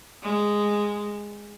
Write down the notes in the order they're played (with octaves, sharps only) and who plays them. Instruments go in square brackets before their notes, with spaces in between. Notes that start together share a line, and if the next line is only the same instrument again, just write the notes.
[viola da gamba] G#3